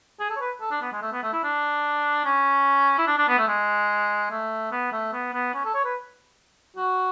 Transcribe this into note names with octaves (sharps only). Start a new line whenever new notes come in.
G#4
A4
C#5
B4
A4
D4
B3
G#3
A3
B3
A3
E4
D4
C#4
E4
D4
D4
B3
A3
G#3
A3
B3
A3
B3
B3
C#4
A4
C#5
B4
F#4